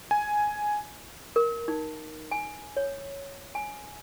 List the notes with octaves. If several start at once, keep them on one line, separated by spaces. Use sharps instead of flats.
G#5
A#4
D#4
G#5
C#5
G#5